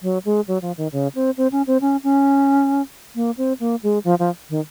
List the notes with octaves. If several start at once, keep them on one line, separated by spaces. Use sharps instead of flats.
F#3
G#3
F#3
F3
D#3
C#3
C4
C4
C#4
C4
C#4
C#4
A#3
C4
A#3
G#3
F3
F3
D#3